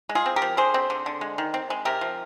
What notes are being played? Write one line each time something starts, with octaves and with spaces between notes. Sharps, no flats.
G#3
F4 G#4
C4
G4 A#4
F3
D3 G#4 C5
C4
D3
D3
G#3
D#3
C4
G#3
C3 G4 A#4
F3